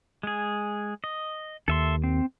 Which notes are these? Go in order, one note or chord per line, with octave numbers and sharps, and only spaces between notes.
G#3 G#4
D#5
D#2 A4 E5 C6
C4